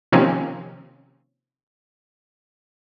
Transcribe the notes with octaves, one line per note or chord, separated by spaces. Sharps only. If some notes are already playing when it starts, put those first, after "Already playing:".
C3 D#3 F3 A#3 C4 C#4